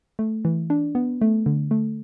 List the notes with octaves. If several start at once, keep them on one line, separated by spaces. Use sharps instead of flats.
A3
E3
D4
B3
A3
D3
A3